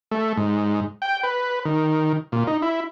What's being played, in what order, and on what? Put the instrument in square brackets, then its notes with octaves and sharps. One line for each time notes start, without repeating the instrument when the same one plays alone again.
[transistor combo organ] A3
G#2
G5
B4
D#3
A#2
D#4
E4